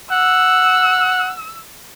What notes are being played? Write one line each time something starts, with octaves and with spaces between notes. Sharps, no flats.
F#5 E6